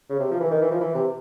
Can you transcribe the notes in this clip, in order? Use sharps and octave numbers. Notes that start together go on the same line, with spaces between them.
C#3
C3
F3
E3
D#3
E3
F3
E3
C3